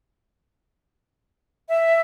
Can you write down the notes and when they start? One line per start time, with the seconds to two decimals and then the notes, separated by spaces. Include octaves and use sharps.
1.68 E5